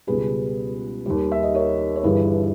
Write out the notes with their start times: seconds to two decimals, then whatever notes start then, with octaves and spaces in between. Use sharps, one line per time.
0.07 C#2 B2 G3 G#4 B4
1.06 D#2 D#3 G3
1.32 E5
1.43 D#5
1.55 A#4 C#5
1.96 C#5
2.03 G1 G2 E3 G3 G#4 B4